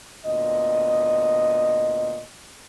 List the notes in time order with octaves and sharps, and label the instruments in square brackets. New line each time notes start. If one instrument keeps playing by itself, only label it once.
[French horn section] D2 A#2 B3 D#5